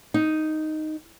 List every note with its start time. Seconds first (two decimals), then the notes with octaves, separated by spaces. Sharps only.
0.14 D#4